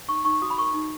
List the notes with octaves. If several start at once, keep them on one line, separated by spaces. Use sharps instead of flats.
D#4 C#6
D#4 C#6
F#4 D#6
B5
A#4 C#6
D#4